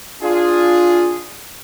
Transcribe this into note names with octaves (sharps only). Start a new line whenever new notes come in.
D4 F4 G#4